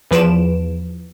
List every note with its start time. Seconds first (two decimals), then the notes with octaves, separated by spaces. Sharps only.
0.11 E2 F3 B4 D7 E7